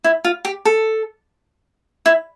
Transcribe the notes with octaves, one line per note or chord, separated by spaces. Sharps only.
E4
F4
G4
A4
E4